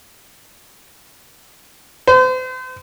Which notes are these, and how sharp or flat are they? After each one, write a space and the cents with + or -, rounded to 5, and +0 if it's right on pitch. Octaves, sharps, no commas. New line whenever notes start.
C5 -40